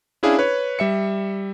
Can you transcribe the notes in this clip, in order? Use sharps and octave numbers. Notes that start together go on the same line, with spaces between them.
C#4 D4 E4 G#4 F5
B4 C#5
G3 E5 C#7